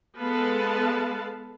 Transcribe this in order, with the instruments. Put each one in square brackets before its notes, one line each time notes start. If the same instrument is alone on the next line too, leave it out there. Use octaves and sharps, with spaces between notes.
[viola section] G#3 B3 A4 B4 F5 A5